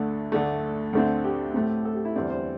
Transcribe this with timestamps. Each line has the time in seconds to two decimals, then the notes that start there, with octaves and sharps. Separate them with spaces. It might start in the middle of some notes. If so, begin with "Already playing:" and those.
Already playing: D2 D3 A3
0.32 D2 D3 A3
0.93 D2 D3 A3 C4
1.24 G4
1.54 A2 A3 C4
1.85 A4
1.94 G4
2.05 E4
2.16 E2 D3 G3 C4 D5
2.30 C5